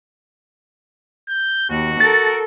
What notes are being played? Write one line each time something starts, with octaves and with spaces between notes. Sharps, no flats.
G6
D#2 F#4
A4 A#4 A6